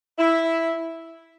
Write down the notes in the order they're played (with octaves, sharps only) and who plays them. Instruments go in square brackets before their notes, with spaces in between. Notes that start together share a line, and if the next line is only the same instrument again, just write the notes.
[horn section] E4